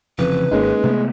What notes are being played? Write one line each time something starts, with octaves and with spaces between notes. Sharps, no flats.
F1 F2 C#3 E3 B4
G#1 G#3 A#3 C#4 D#4
C3 A3 B3